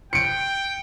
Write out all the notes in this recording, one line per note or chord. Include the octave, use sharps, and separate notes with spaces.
G5 C#7 D7